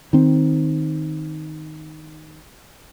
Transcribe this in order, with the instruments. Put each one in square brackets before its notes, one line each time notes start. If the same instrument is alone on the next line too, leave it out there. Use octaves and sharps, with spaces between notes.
[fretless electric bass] D#3 C4